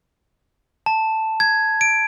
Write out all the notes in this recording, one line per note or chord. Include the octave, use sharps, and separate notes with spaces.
A5
G#6
D7